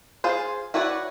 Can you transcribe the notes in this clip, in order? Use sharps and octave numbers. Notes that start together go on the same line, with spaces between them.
F4 G#4 C5
E4 F#4 B4 C#5 D5